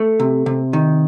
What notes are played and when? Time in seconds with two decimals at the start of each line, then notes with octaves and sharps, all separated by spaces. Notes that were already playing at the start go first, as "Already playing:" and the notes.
Already playing: A3
0.20 C3
0.46 C3
0.73 D#3